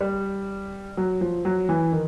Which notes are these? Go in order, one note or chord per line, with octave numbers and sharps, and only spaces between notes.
G3
F#3
F3
F#3
E3
D#3